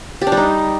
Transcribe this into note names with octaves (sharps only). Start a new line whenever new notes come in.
G4
D4
G3
D#4